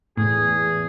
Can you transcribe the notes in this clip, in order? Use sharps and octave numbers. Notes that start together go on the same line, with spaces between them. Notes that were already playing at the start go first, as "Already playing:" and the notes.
E2 A2 G#4